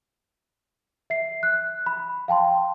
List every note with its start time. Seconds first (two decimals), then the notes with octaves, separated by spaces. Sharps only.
1.10 E5 C7
1.43 F#6
1.86 B5
2.28 F5 G5 A5 C6